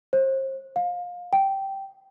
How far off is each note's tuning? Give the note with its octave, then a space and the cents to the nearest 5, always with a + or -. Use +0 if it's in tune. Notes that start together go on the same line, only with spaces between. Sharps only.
C5 +35
F5 +25
G5 -10